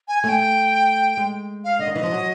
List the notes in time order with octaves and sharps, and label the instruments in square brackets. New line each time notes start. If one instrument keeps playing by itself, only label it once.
[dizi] G#5
[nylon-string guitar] A3 [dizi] G#5
[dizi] G5
[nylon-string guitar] G#3
[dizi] F5
[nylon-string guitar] D3 [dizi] D#5
[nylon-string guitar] D#3
[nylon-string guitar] E3 [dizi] D#5
[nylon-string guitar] F3
F#3